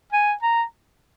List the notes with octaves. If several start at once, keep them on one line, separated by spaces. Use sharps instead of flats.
G#5
A#5